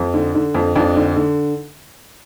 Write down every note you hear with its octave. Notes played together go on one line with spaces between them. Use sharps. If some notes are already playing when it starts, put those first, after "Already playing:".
Already playing: F2
D3
D3
F2
F2 D4
D3
D3